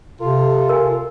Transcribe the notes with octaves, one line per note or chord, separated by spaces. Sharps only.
C3 F4 A4
A#4 G#5